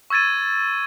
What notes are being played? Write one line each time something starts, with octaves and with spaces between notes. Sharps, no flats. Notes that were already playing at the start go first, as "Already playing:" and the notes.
C#6 E6 G#6 A6 D#7